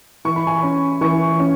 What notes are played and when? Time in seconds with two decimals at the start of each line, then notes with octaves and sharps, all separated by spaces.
0.25 E3 C#6
0.36 B5
0.47 G#5
0.58 C#4 B5
1.01 E3 C#6
1.40 C#4